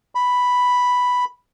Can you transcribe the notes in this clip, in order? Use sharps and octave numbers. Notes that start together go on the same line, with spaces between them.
B5